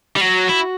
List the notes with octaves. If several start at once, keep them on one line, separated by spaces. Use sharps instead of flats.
G3
F#3 F#4
E4